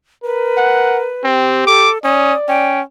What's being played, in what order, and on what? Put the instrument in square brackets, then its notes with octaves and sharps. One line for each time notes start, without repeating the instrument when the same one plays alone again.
[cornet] A#4 [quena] B4
[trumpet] F#5
[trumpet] C4 [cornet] G4
[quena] A4 [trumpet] D6
[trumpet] C#4 [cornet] D5 [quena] D#6
[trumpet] C#4 [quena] G5